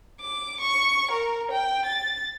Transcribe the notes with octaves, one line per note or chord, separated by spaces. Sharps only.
D6
C#6
A#4
G5
A6